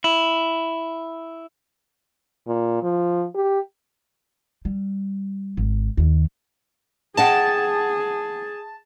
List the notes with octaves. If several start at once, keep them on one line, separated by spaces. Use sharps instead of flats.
E4
A#2
F3
G4
G3
G#1
D#2 D#3
G#4 D#5 F#5 G5 A5